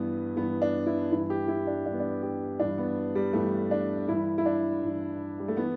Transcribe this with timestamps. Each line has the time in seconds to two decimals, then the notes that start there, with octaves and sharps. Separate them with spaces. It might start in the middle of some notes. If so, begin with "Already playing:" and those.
Already playing: G2 E3 B3
0.36 G2 E3 B3
0.62 D4
0.86 E4
1.11 G2 E3 E4
1.30 G4
1.48 E4
1.67 D4
1.85 G2 E3 D4
1.92 B3
2.00 D4
2.23 G4
2.60 G2 E3 D4
2.78 B3
3.15 G3
3.33 G2 E3 A3
3.71 D4
4.08 G2 E3 E4
4.38 E4
4.46 D4
4.82 G2 E3
5.40 G3
5.48 A3
5.57 E3 B3